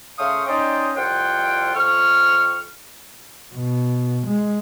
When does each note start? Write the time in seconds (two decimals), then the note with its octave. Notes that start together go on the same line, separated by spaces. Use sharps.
0.18 C#3 A3 C5 F5 C#6 D#6
0.46 C#4 D#4 C5 D5 D#5 G5
0.95 C2 F2 F4 F#5 G5
1.73 F2 C#6 F6
3.54 B2
4.27 G#3